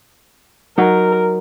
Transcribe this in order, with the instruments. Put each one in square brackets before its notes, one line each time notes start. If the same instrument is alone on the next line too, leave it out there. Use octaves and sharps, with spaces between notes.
[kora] F#3 D#4 [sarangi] A#4